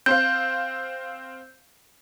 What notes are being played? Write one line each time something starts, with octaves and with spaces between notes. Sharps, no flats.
C4 C5 F5 G6